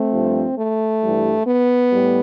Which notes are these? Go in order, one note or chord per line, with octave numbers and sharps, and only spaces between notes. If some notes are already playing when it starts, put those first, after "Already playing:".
Already playing: A3 C4
G2 F3
A3
G2 E3 G3
B3
A2 G3